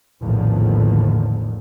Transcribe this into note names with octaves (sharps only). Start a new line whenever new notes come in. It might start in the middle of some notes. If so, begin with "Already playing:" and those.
A#1 E2 A2 D3 D#3 F3